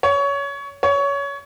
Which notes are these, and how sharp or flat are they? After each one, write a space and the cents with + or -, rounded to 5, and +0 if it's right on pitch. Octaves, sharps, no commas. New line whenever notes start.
C#5 +20
C#5 +20